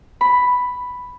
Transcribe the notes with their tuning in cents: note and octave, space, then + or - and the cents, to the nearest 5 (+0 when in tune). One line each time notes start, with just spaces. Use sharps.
B5 +5